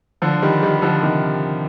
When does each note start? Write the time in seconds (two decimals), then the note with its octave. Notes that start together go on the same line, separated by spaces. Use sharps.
0.22 D3 F3
0.42 D#3 G3
0.63 D#3 G3
0.82 D3 F3
1.02 C3 D#3